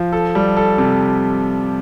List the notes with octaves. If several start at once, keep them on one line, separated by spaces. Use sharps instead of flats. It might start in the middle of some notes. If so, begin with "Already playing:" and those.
Already playing: F3
A4
G3
A4
C3